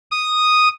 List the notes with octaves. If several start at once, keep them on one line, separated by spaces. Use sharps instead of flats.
D#6